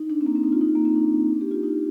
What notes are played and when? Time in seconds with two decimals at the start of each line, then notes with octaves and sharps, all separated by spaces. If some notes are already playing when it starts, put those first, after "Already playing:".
Already playing: D#4
0.09 D4
0.21 C4
0.26 A#3
0.35 C4
0.43 D#4
0.52 F4
0.61 D#4
0.75 A#3
0.85 C4
0.95 D4
1.41 G4
1.51 F4
1.63 D#4